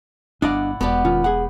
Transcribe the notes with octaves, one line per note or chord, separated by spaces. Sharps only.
G1 D4 E4 D5 D#5 F5 F#5
E1 B2 B3 G4 D5
D#3 C#4 F4
G#4 F#5